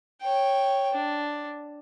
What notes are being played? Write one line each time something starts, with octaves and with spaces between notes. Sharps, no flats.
C#5 G5
D4